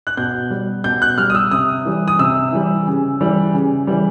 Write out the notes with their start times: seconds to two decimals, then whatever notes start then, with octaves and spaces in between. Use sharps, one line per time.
0.07 F#6
0.17 B2 G6
0.51 G3
0.84 B2 G6
1.02 F#6
1.18 G3 F6
1.30 D#6
1.35 E6
1.51 C3 D#6
1.85 E3 G3
2.08 D#6
2.19 C3 E6
2.52 E3 G3
2.87 C#3
3.21 E3 G3
3.54 C#3
3.87 E3 G3